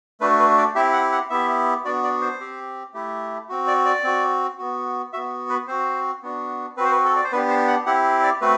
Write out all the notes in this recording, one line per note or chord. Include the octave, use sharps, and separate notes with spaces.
A3 D4 F#4 B4
B4
D5
C4 E4 G4 E5
F#5
F#5
B3 E4 G4 E5
B3 D4 F#4 D5
D5
C5
C4 G4
A3 E4 G4
C4 F#4
D5
D5
C4 F#4
B3 F#4
B3 F#4 E5
B4
C4 F#4 C5
B3 D4 F#4
C4 F#4 B4 C5
B4
A4
D5
C5
B3 D4 G4 B4
C5
F#5
C4 E4 G4 F#5
D5
A3 C4 F#4 B4